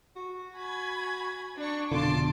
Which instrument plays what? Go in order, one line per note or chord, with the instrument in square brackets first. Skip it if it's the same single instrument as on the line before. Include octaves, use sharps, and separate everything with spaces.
[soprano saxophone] F#4
[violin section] G#5 B5 G#6
D4 C#6
[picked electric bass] F1 B2 D3 [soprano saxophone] F4 [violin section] A5 C6 D6